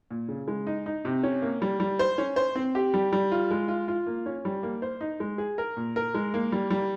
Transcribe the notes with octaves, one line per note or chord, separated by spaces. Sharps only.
A#2
C#3
G#3
D#4
D#4
C3
C#4
A#3
G3
G3
C5
C#4
C5
C4
G4
G3
G3
F4
G#3
F4
F4
A#3
C#4
G3
A#3
C5
D#4
G#3
G#4
A#4
A#2
A#4
G#3
A#3
G3
G3